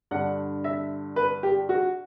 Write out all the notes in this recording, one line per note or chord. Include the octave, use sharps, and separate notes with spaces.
G2 D3 F#5
E5
B4
G4
F#4